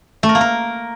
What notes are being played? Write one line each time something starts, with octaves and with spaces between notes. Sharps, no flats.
A3
A#4
A#3
A#4